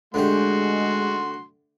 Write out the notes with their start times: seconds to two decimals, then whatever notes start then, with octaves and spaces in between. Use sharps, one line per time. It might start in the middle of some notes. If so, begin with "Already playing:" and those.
0.14 D3 G#3 A3 F#4 G4 C6